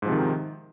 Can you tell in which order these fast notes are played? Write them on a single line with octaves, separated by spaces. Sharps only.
G#2 F3 C3 D#3